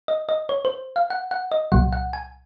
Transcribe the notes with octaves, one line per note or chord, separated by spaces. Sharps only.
D#5
D#5
C#5
C5
F5
F#5
F#5
D#5
C2 A#2 F#3 F#5
F#5
G#5